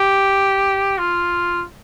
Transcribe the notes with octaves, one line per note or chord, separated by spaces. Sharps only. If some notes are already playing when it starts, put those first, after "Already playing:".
Already playing: G4
F4